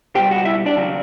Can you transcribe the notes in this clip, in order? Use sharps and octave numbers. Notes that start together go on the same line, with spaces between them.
C#2 B2 G3 G4 G5
F#4 F#5
E4 E5
D4 D5
D#2 C#3 F#3